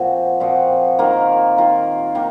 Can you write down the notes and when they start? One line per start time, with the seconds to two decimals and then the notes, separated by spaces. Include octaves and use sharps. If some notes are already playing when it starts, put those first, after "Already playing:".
Already playing: A#2 F3 C4 F#4
0.40 A#2 F3 C4 F#4
0.99 D#3 A#3 F4 A#4
1.57 D#3 A#3 F4 A#4
2.15 D#3 A#3